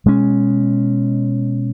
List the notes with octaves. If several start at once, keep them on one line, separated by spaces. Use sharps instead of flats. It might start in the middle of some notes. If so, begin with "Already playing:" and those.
B2 G#3 C#4